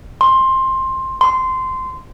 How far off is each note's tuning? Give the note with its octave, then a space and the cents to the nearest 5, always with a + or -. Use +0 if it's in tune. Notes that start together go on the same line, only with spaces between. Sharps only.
C6 +15
C6 -15